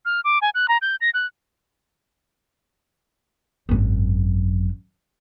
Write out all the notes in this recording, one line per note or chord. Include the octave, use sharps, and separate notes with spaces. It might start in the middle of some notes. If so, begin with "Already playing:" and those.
F6
D6
G#5
F#6
A#5
G6
A#6
F#6
G#1 F#2